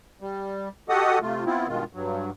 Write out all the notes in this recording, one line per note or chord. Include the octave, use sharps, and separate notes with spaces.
G3
F#4 G4 A4 D#5 F#5 D#6
C3 A3 F4
B3 C4 E4 F4
G2 B2 D#3 G#3 F4
G2 F#3